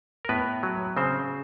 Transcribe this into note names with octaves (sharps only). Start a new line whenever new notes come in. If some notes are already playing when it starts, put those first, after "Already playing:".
A#4
A2 B3 B4
F#3
C#3 C4 C5